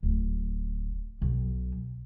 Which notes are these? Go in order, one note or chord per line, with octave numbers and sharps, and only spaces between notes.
D1
B1